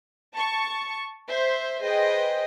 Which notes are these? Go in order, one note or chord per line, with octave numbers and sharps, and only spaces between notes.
A5 C#6
C5 E5
G#4 B4 C5 D#5 G5